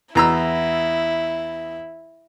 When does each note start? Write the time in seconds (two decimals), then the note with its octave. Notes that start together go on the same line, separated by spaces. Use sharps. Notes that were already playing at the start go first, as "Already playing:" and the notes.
0.15 E2 E4 A#5 E6